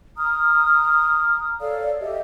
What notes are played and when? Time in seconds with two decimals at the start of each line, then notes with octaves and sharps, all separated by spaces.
0.17 A#5 D#6 F6
1.60 A4 C#5 D5 F5
2.00 G4 D#5 E5